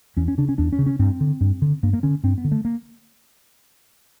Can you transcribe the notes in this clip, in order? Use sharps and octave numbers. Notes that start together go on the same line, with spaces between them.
E2 C#4
C#4
C#3 D4
C#4
E2 D4
C#4
C#3
C#4
G2 C4
D3
G2
D3
G2 A#3
A#3
D3 C#4
G2 C4
B3
D3
A3
A#3